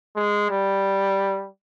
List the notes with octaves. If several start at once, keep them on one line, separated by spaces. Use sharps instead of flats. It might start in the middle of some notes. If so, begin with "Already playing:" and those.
G#3
G3